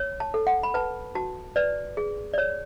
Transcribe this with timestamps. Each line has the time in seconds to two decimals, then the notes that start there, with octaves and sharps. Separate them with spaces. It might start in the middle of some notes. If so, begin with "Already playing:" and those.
Already playing: C#5
0.20 A5
0.34 A4
0.47 F#5
0.63 B5
0.74 B4 A5
1.15 F#4 A5
1.56 B4 D5
1.97 G#4
2.33 D5
2.38 C#5